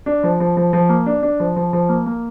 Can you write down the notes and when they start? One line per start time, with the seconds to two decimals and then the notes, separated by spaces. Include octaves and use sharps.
0.06 D4
0.23 F3
0.40 F3
0.57 F3
0.73 F3
0.89 A#3
1.06 D4
1.23 D4
1.40 F3
1.56 F3
1.73 F3
1.89 A#3
2.06 A#3